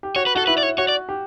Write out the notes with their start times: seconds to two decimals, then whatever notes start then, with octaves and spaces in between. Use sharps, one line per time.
0.03 G4
0.16 F#4 C#5
0.26 B4
0.35 F#4 A4
0.47 E4 B4
0.58 D5
0.63 C#5
0.78 F#4 C#5
0.89 D5
1.09 G4